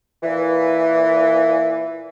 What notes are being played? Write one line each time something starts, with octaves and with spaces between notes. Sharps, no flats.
A#2 E3